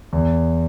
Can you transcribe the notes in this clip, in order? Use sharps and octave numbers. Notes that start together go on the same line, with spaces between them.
E2